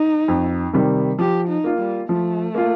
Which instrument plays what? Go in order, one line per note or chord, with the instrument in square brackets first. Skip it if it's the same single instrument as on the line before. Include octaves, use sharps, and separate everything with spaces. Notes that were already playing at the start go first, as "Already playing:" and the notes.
Already playing: [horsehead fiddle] D#4
[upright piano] F2
C3 D#3 G3
[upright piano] F3 [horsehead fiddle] G4
[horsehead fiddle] D#4
[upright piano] A#3 F4
[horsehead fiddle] G3
[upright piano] F3 [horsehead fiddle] A3
[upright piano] A#3 F4